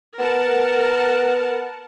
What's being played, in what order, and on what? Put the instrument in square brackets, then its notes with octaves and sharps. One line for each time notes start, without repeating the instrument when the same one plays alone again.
[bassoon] B3 [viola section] A#4 F#5 A5